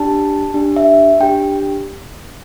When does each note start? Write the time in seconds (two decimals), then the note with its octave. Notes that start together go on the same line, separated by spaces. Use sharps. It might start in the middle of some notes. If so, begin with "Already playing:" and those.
Already playing: D4 G4 A5
0.54 D4 G4
0.76 E5
1.20 D4 G4 G5